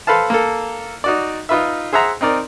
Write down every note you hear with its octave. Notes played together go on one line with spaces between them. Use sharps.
A4 B4 C5 F5 A5
A#3 A4
D#4 F#4 D5
D#4 F4 B4 E5
G#4 C5 E5 F#5 A#5
C4 D#4 A#4 D5